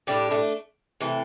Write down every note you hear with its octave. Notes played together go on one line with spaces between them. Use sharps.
A2 G3 D4 G4
A3 D4
C3 E3 A3